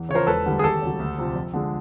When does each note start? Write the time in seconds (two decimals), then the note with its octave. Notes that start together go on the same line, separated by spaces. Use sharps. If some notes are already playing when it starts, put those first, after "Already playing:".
Already playing: E2
0.09 C#3 C#5
0.14 F3 A#4 C5
0.27 E1 A4 B4
0.46 D2 D3 G3
0.59 G#4
0.63 D#2 G4 A4
0.82 C#3 F#3
0.99 D2
1.18 C3 F3
1.35 F2
1.53 D3 F3 G#3